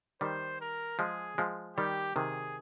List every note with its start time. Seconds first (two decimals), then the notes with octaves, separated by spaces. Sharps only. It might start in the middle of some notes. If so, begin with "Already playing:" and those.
0.21 D#3 G3 C5
0.61 A#4
0.99 F3 G#3 G#4
1.38 F3 G#3
1.77 D#3 G3 G4
2.16 C3 D#3 G#4